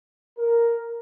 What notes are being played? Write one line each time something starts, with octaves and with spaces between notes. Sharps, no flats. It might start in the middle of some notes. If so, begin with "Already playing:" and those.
A#4